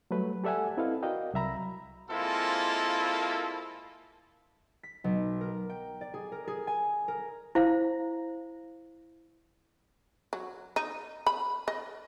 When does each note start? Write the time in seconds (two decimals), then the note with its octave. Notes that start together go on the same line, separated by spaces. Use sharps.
0.11 F#3 G3 A3 B4
0.44 G4 A4 D5 E5 F#5 G#5
0.77 C4 E4 A4 B4 D#5 F5
1.03 F#4 A#4 D5 D#5 F5 G5
1.34 C2 F#3 E5 A#5 B5
2.10 G#3 A#3 C4 E4 F4 A4
4.83 B6
5.04 B1
5.41 A#4
5.69 G5
6.01 D5
6.14 G#4
6.32 A#4
6.48 G#4
6.67 G#5
7.08 A#4
7.55 E4 C5 F5
10.33 F#3
10.76 D#4
11.26 B5
11.68 D#5